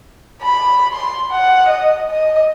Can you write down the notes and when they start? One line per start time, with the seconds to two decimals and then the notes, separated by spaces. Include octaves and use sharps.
0.42 B5
0.93 C6
1.31 F#5
1.69 D#5
2.11 D#5